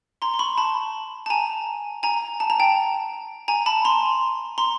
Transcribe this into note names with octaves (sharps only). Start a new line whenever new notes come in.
A#5 C6
C6
B5 C#6
A5 B5
A5
G#5 A#5
G#5 A#5
A5
A#5
G5 A5
G#5 A#5
A5 B5
A#5 C6
A#5 C6